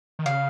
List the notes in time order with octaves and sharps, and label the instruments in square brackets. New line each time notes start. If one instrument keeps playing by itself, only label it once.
[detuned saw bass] D#3
[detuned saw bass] C#3 [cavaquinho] F5